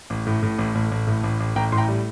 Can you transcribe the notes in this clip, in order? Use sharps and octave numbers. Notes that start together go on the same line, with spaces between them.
A1
A2
A2
A1
A1
A1
A2
A1
A1
A1 G5 A#5
A2 C6
G5 A#5
G3